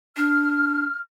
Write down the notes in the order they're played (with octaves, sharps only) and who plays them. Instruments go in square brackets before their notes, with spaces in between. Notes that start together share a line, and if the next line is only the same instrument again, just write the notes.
[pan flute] D4 [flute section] F6